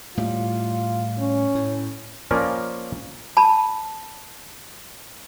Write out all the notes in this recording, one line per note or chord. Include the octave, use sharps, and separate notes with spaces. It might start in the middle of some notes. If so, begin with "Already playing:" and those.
A2 G3 F4
C#4
A2
F3 A#3 C#4 A#4 D5
A5 B5